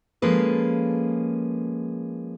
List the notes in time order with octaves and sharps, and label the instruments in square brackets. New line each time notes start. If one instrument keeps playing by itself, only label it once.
[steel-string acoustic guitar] F3 G#3 A#3 C#4 A4 B4